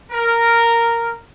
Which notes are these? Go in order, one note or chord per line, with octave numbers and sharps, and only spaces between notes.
A#4